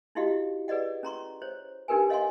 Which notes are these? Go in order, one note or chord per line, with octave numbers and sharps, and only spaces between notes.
D#4 E4 F#4 G4 D#5 F5
G#4 B4 D5 D#5 F#5
C#4 A#5 C6 C#6
C5 C#5
D4 D#4 G4 A#4 B4 G#5
C#5 D#5 F5 F#5 G#5 C6